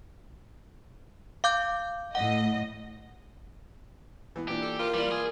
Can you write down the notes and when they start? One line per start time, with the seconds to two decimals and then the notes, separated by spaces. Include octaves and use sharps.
1.44 F5 D6 G6
2.15 A2 D#5 F#5
4.36 E3 B3
4.48 A#2 E3 D4 G4
4.62 A4
4.79 F4 A#4
4.94 E3 G3 A#3 D5
5.11 G#4